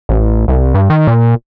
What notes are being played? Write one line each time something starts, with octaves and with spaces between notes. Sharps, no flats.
A1
C2
G2
D#3
A#2